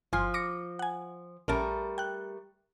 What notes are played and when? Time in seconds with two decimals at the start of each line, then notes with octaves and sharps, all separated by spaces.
0.13 G1 F3 G#5 C6
0.34 D6 A#6 C#7
0.79 F#5 G#5
1.48 A#1 G3 A3 C#4 A#4 A5
1.98 G5 F#6